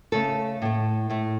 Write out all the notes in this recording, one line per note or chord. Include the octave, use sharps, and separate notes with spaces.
C#3 A3 A4
A2 A3
A2 A3